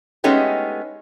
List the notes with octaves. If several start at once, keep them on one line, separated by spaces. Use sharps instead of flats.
G#3 A3 B3 C#4 D#4 G4